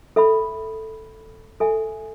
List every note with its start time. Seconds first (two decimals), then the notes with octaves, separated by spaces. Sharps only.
0.16 A4 E5 B5
1.60 A4 E5 G#5